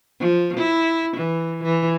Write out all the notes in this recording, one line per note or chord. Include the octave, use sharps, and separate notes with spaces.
F3
E4
E3
E3